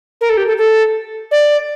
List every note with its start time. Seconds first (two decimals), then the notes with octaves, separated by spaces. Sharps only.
0.21 A#4
0.30 A4
0.37 G4
0.47 A4
0.57 A4
1.31 D5